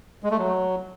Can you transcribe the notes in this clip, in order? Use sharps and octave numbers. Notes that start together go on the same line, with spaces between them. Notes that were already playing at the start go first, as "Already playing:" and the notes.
G#3
A3
F#3